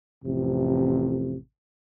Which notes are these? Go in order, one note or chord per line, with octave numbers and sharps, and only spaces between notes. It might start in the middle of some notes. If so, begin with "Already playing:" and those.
A1 F2 C3